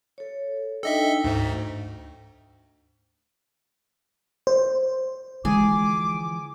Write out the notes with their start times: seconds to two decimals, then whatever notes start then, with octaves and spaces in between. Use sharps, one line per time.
0.18 A4 C#5
0.83 D4 D#4 A4 D#5 E5 G5
1.24 D2 G#2
4.47 C5
5.45 D3 E3 F3 G#3 G#4 D6